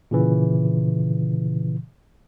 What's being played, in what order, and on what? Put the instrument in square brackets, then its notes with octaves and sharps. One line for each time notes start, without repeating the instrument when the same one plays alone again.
[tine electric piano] A#2 C#3 E3